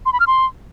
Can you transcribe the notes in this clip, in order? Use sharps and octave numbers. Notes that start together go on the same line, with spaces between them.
C6
B5
F6
C6